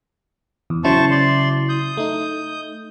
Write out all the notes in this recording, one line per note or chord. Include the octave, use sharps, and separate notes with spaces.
E2
C#3 F#3 E4 C5 A5 C#6
D5 C6
D#6 G6
A3 D#4